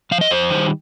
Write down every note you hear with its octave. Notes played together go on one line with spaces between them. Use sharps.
F3 F5
D#5
F2 C5
D#3 G3